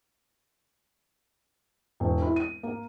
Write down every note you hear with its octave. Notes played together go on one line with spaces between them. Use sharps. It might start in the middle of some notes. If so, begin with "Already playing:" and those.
E1
E4
D#7
A#3